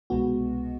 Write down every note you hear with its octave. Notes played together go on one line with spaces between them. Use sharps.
C2 B2 G#3 B3 F#4